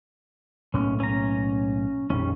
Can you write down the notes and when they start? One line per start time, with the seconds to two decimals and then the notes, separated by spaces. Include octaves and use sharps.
0.74 B1 A2 A#3 C#4
1.00 C#4 A#5
2.10 A#1 F2 D#3 G3 C#4